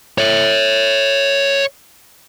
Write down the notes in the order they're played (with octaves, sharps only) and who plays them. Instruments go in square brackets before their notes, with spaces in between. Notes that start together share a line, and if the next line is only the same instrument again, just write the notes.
[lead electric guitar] C#5 E5